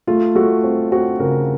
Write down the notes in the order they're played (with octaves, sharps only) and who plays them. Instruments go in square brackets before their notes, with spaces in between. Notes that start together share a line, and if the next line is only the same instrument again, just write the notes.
[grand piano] A3 F4
A3 F#4
C4
C4 F#4
C#3 A#4